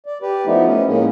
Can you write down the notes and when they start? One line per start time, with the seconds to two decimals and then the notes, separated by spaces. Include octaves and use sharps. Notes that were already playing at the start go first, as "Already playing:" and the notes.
0.06 D5
0.22 G4 B4 D5
0.45 F3 A3 B3 D#4 E4
0.66 C#4
0.86 A2 G#3 A#3 C#4